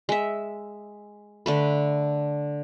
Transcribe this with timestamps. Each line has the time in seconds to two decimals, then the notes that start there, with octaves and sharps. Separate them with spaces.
0.09 G#3 E5
1.46 D3 A3 B4